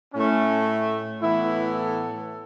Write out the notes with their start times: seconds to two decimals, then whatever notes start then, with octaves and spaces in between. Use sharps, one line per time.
0.14 A2 A3 C#4
1.20 A2 E3 B3 E4
1.74 A4